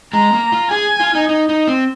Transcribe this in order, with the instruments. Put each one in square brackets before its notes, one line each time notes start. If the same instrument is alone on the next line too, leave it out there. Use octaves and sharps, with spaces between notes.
[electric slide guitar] G#3 [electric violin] A#5
[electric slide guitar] A#3
F4
[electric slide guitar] G#4 [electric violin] G#5
[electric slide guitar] F4
D#4
D#4
D#4
C4